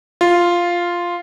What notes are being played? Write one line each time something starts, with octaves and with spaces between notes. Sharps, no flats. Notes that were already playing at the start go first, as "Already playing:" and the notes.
F4